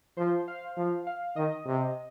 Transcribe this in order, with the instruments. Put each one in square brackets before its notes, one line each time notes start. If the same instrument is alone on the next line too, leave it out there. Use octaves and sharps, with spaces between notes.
[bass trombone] F3 [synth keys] C5
[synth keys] F5
[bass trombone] F3
[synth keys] F5
[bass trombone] D#3 [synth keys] D#5
[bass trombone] C3